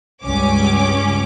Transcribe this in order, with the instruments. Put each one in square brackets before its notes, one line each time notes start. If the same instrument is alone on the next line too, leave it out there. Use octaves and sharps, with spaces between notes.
[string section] C#2 G2 C#4 D6